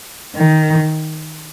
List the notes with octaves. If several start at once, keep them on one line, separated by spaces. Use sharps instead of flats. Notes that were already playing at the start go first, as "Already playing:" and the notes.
D#3